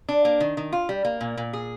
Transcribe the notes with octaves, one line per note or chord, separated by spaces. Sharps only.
D4
A#3
D#3
D#3
F4
G3
A#3
A#2
A#2
G#4